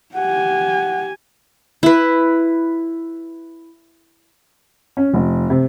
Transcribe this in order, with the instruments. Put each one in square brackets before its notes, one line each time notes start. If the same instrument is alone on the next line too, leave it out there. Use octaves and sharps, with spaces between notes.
[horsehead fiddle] G4 G#5 [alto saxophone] F#5
[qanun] E4 B4
[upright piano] C#4
F1
C3